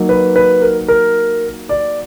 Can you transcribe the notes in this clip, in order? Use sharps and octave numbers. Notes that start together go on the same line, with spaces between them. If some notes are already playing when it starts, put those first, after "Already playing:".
Already playing: F#3 A#3 D#4
B4
B4
A#4
A#4
D5